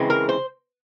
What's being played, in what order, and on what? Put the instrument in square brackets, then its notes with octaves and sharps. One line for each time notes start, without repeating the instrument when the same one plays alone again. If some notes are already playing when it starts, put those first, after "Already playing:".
Already playing: [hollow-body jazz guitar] C#2 C#3 E3 G#3 C4
A#4
C5